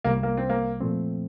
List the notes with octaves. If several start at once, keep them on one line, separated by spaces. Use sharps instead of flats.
C2 C3 G3 A#3
A#3
C4
A#3
A#2 F3 A3 C4